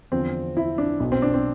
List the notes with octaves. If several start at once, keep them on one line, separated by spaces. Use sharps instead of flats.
E2 D3 F3 C4
E4
D4
B1 B2
C4
D4
C4